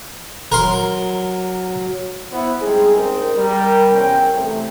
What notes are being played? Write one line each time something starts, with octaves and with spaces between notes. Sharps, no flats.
F#3 A#4 C6
B3 E4 C5
G3 G#3 C4 D#4 G#4
C4 C#4 D#4 G#4 A#4
G3 A#4
E2 C3 C4 C#4 A#4 G5
E2 C3 A3